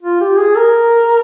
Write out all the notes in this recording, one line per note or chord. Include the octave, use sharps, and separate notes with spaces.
F4
G4
G#4
A#4